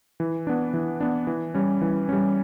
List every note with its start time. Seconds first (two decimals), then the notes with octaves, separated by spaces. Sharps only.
0.20 E3
0.47 B3 D4
0.74 E3
1.01 B3 D4
1.27 E3
1.54 G3 C#4
1.81 E3
2.09 G3 C#4